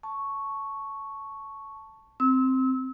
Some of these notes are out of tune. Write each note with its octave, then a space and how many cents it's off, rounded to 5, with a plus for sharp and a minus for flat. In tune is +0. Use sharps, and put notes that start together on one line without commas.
A5 +0 C#6 +0
C4 +0 E6 -35